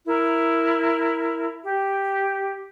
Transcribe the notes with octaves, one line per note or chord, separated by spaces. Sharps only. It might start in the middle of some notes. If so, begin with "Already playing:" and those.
E4 A#4
G4